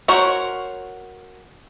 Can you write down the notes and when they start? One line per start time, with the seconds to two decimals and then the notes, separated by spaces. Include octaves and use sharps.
0.08 F#4 A#4 C5 C#5